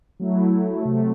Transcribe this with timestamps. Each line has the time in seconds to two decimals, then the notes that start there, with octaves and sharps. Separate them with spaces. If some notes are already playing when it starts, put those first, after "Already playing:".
0.20 F#3 A3 E4
0.82 C3 F#3 A3